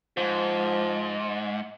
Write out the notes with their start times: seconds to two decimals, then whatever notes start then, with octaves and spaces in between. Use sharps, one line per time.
0.17 G#2 F3